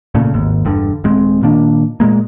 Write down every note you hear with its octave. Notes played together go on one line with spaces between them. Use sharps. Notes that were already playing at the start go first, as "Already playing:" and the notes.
A#2 C#3 A3
G#1 D#2
E1 G2 D3
D#1 G#3 C4
A#2 D#3 A#3 D4
A#2 G#3 A#3